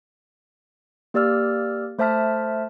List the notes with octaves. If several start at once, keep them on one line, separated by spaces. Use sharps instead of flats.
A#3 G4 D5 E6 F6
A3 C5 E5 A5 F6 B6